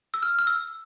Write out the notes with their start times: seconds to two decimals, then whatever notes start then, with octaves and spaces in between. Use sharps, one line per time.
0.14 E6
0.23 F6
0.39 F6
0.47 E6